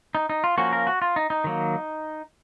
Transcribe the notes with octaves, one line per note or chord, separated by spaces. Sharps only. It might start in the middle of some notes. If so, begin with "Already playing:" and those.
D#4
D#4
F4
F3 A#3 C#4 F#4
A#4
F#4
F4
D#4
D#4
D#3 F#3 A#3